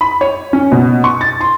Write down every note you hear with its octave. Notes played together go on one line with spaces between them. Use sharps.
B5
C#5
C#4
B2
C#6
A6
C6